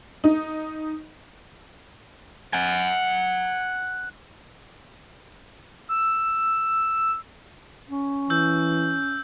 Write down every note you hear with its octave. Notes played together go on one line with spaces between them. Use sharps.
D#4
F#5 G#5
E6
C#4
E3 E6 G6